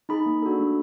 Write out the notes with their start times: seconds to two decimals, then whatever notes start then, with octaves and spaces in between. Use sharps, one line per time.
0.09 D#4 G#4 B5
0.26 A#3
0.42 D4 F#4 A4
0.59 A3